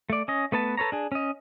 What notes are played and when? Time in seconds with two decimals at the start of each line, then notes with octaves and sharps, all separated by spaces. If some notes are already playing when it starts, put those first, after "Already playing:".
0.10 A3 D5
0.28 C#4 D#5
0.52 A3 B3 B4 A5
0.77 A4 B4 C#5 A#5
0.92 D4 G#4
1.12 C#4 D#5